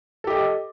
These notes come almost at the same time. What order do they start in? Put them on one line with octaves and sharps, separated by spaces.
A4 G4 D#5